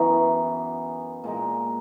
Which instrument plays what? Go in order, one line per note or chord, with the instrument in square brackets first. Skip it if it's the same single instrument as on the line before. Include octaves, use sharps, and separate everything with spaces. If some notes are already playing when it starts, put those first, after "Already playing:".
Already playing: [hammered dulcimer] F#2 E3 B3 D#4
A#2 G#3 D#4